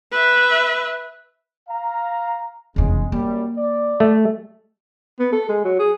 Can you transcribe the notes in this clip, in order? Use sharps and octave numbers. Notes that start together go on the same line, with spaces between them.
B4 E5
F5 A#5
F1 E2 C#3 G#3
F#2 G3 A#3
D5
A3
B3
A4
G#3
F#3
G#4